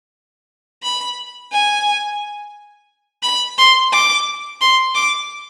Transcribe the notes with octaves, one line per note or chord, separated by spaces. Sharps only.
B5
G#5
B5
C6
D6
C6
D6